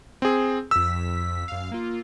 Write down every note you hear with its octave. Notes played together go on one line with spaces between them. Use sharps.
C4 G#4
F2 E6 B6
F#2 F5
A#3 F4